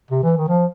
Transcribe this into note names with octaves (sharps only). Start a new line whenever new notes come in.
C3
E3
D#3
F3